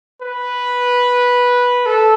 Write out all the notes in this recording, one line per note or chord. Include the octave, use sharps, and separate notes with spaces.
B4
A4